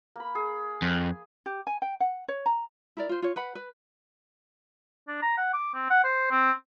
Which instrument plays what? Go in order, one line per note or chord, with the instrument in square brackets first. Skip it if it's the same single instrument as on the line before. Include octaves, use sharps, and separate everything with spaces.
[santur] A#3 B5
G#4
[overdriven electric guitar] F2
[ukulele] G4
G#5
G5
F#5
C#5
A#5
E4 A#4 D5
F4 C5
F4 C#5
B4 F#5 B5
B4
[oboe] D4
A#5
F#5
D6
C4
F#5
C5
C4